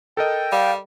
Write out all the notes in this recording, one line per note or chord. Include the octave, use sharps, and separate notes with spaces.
A4 A#4 D#5 G5
G3 F5